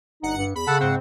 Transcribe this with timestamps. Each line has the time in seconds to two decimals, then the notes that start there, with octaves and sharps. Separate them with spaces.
0.23 G1 D#4 F#5 C#7
0.37 G2
0.55 E2 B5
0.67 C#3 A4 F#5 A5
0.80 G#2 C4 F#5